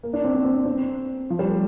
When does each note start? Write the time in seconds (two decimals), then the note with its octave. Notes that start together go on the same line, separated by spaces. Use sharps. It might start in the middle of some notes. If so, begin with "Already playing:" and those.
0.03 A#3
0.13 D4
0.24 C4
0.34 C4
0.45 C4
0.55 D4
0.65 C4
1.30 F3
1.39 G3
1.49 A3